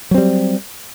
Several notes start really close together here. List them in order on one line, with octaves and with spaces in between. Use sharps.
F#3 C4 G3